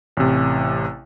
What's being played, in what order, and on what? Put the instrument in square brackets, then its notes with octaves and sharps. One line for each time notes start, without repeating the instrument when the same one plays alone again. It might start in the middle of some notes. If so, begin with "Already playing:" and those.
[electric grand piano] A1 C3